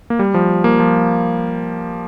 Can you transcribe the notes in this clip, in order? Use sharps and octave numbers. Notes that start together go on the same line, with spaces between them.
A#3
G3
F3
A#3
F3